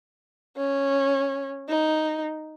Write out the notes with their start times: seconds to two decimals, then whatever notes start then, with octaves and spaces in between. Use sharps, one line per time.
0.57 C#4
1.69 D#4